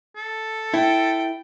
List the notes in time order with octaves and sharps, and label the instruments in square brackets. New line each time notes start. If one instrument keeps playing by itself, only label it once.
[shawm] A4
[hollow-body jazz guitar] E4 [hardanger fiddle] G5